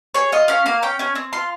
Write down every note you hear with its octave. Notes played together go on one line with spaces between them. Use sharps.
G#4 C#5
F4 D#5
C#4 F5
A#3 F5
C#4 G5
C#4 G#5
C4
F4 C6